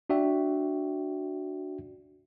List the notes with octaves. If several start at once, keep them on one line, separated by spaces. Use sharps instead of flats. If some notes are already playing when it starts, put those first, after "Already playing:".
D4 F#4 D5 E5 G5